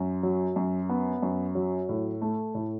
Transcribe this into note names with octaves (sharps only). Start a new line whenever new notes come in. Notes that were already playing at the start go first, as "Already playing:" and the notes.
Already playing: F#2
F#3
F#2
B3
F#2
F#3
A2
A3
A2